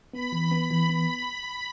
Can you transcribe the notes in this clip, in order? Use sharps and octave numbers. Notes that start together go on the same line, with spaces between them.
B3 B5
E3
B3
E3
B3